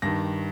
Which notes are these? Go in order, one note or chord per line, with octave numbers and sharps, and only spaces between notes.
G2 D#3 A#6